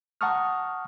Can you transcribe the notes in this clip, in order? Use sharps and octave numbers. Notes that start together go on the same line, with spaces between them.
F#5 A5 A#5 C#6 D#6 F6